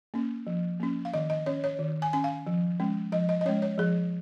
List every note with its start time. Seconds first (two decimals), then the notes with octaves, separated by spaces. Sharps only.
0.14 A#3 C#4
0.47 F3
0.80 A#3 C#4
1.05 F5
1.14 D#3 D#5
1.30 D#5
1.46 C#4 C#5
1.64 C#5
1.79 D#3
2.02 G#5
2.13 C#4 G#5
2.24 F5
2.47 F3
2.80 G#3 C#4
3.12 F3 D#5
3.29 D#5
3.41 D#5
3.45 G#3 C#4 C#5
3.62 C#5
3.78 F3 G#4